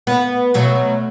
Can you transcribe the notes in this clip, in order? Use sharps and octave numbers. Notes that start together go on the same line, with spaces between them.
B3
B2 F#3 A3